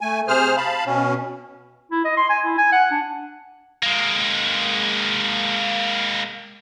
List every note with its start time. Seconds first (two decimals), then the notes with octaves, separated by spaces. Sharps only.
0.01 A3 G#5
0.28 C3 G#4 C5 F6
0.57 F5 A5 B5
0.85 B2 C#4
1.91 E4
2.05 D#5
2.17 C6
2.30 G#5
2.45 E4
2.58 G#5
2.72 F#5
2.91 D4
3.83 G#3 A#3